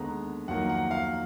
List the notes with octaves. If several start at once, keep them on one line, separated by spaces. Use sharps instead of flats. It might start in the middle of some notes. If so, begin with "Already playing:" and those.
Already playing: D#2 D3 G#3 B3 A#5
F2 D#3 F#3 A#3 D#4 F#5
F#5
F5